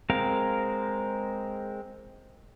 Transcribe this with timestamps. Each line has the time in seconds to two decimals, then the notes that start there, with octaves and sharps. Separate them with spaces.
0.10 G#3 C4 A#4 F5